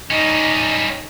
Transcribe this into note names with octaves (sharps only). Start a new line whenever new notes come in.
G3 C#4 D#4 D#5